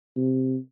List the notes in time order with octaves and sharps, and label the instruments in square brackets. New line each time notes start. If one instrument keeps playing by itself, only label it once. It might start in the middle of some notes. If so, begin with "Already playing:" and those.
[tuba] C3